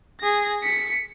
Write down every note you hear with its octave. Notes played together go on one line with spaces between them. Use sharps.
G#4 A#6
B6 C#7